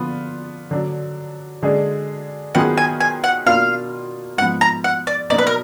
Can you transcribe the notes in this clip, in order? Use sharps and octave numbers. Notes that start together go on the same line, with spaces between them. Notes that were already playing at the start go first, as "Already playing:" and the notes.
Already playing: D3 F3 B3 D4 F4
D3 F#3 D4
D3 G#3 D4 G#4
D#3 F#3 B3 F4 G#4 F#5
G#5
G#5
F#5
B2 A#3 D4 F4 F5
G#2 F3 B3 F#5
A#5
F#5
D5
B2 F#3 A#3 D#4 D5
B4
A#4